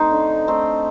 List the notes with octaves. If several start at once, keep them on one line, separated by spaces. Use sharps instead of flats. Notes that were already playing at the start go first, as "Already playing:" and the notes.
Already playing: A3 C4 D#4 C5
D3
A3 C4 D#4